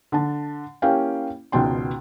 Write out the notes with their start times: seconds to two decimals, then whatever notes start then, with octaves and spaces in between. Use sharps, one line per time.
0.12 D3 A5
0.82 A#3 C#4 E4 G4 F5 G5
1.52 G#1 C#2 B2 G5 C6